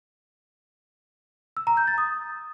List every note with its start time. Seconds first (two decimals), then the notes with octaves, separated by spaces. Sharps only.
1.57 E6
1.67 A#5
1.77 G6
1.88 A6
1.98 D#6